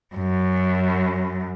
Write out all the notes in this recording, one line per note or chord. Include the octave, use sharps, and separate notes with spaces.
F#2